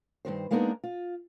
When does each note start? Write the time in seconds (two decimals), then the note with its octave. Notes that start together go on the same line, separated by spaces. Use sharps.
0.25 G2 A#2 D#3 C5
0.51 G#3 A#3 B3 D4 D#4 A#4
0.84 F4